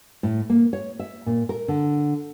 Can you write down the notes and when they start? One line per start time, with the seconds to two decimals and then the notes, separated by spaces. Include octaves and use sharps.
0.23 A2
0.50 A#3
0.73 C#5
0.99 E5
1.26 A#2
1.49 A#4
1.68 D3